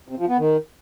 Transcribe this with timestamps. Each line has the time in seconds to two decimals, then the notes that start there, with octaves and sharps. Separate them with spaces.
0.08 C3
0.19 F3
0.29 B3
0.39 D#3